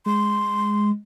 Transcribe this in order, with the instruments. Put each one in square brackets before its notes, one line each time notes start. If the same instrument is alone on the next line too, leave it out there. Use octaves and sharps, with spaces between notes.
[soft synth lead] G#3 [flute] C6